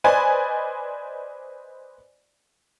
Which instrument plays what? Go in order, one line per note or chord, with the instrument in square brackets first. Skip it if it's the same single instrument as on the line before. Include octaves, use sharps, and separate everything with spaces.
[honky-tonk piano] B4 C5 D5 D#5 G#5